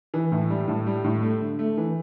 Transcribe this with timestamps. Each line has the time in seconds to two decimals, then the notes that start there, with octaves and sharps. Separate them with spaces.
0.14 E3
0.32 A2
0.50 G3
0.68 A2
0.86 G3
1.04 A2
1.23 A3
1.40 D3
1.59 A3
1.77 E3